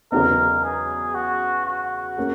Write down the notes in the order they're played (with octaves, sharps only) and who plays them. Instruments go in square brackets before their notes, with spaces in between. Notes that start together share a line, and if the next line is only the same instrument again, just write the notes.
[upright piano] E2 C#3 F#3 B3 D#4 [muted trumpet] A#4
[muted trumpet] G#4
F#4
F#4
[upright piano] A#3 C#4 G#4